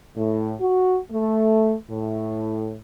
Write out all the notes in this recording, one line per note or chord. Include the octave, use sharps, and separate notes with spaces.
A2
F#4
A3
A2